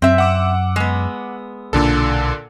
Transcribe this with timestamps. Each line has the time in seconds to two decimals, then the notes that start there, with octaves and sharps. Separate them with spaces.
0.02 F#2 C4 E5
0.18 F#5 D6 E6
0.76 G#3 B3
1.73 B1 A#2 D3 D#3 D4 A4